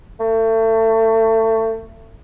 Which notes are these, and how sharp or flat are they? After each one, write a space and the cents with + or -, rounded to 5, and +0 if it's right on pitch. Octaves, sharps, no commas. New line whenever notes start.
A3 +30